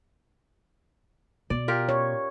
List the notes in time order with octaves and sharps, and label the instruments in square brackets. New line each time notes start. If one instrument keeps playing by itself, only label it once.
[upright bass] B2 [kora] D5
[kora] F4 G4 A#4
[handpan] C#5